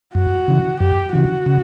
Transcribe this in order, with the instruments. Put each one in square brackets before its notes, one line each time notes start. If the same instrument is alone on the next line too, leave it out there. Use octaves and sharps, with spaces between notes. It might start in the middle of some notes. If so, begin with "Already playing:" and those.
[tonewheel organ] F#2 [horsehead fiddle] F#4
[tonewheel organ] C#3 E3
[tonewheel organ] F#2 [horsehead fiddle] G4
[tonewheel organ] C#3 E3 [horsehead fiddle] F#4
[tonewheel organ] C#3